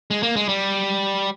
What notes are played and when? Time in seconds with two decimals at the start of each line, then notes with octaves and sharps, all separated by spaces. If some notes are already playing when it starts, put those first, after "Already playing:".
0.11 G#3
0.23 A#3
0.36 G#3
0.49 G3